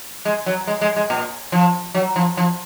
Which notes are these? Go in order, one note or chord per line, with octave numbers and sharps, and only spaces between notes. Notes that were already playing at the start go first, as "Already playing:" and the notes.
G#3
F#3
G#3
G#3
G#3
A#2
F3
F#3
F3
F3